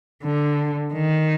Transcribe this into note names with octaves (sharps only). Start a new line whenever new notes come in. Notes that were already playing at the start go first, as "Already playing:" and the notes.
D3
D#3